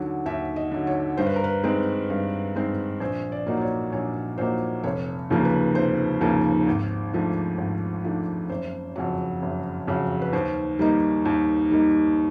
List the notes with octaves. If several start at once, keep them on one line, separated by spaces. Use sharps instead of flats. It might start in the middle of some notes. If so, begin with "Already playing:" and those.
Already playing: D#2 D3 F#3
D#2 E5
D#5
D3 F#3
C#5
G2 C5
B4
A#4
B4
D#3 G#3 C4
G2
D#3 G#3 C4
A#1 C5
D5
A#2 F#3 A#3 D#4
D5
C#5
A#1 C#5
A#2 F#3 A#3 D#4 C5
F1 C#5
D#2 C#3 F3 A#3
B4
F1 C5
D#2 C#3 F3 A#3
G#1
G#2 F3 A3 D4
G#1
G#2 F3 A3 D4
F#1 C5
F2 C#3 F#3
F#1
F2 C#3 F#3
B4
D#2 C5
D#3 G3 A#3 D#4
D#2
D#3 G3 A#3 D#4